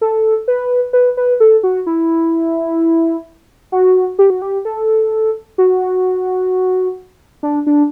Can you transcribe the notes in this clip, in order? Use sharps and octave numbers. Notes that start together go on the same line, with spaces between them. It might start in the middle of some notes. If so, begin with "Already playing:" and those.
A4
B4
B4
B4
A4
F#4
E4
F#4
G4
F#4
G4
A4
F#4
D4
D4